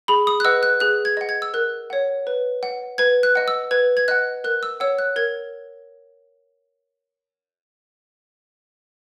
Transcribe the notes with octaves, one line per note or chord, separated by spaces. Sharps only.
G#4 B5
D#6
F#6
B4 D#5 F#5 E6
F#6
G#4 F#6
G#6
D#5 F#5
G#6
E6
A#4 F#6
C#5 F#5
B4
F#5
B4 G#6
F#6
D#5 F#5
E6
B4 G#6
G#6
D#5 F#5 F#6
A#4 F#6
E6
C#5 F#5 E6
F#6
A#4 G#6